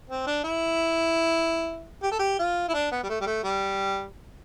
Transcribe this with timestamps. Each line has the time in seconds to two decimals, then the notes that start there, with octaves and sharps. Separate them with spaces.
0.10 C4
0.27 D4
0.44 E4
2.03 G4
2.12 A4
2.19 G4
2.39 F4
2.69 E4
2.74 D4
2.92 B3
3.04 G3
3.09 A3
3.21 G3
3.26 A3
3.44 G3